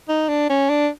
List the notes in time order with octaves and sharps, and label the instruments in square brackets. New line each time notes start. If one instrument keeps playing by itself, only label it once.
[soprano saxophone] D#4
D4
C#4
D4